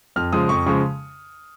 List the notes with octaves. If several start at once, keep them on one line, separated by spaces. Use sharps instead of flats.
F2 F6
C#3 F3 G#3 D#6
F2 C#6
C#3 F3 G#3 C#6